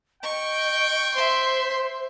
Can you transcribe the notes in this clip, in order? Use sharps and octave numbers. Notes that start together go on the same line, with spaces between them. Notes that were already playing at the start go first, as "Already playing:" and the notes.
D#5 G5 C#6
C5 E5 C6